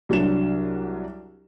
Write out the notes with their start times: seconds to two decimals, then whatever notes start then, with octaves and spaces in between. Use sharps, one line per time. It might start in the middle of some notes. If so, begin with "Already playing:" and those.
0.09 C2 F#3 D4 E7